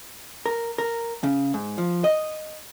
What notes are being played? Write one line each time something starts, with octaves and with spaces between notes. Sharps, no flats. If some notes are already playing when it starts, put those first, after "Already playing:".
A#4
A#4
C#3
G#2
F3
D#5